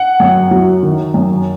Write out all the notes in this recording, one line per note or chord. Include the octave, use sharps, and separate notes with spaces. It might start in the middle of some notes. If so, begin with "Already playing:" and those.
Already playing: F#5
F#2
F#3
D#3
F#2